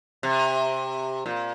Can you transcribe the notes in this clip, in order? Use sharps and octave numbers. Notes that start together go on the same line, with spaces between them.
C3
A#2